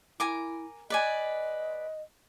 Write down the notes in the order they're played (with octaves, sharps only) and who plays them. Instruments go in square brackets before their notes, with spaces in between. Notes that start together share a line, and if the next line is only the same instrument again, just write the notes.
[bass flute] E4 [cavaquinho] A#4 G#5 D6
[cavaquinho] B4 D5 G#5 [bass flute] D#5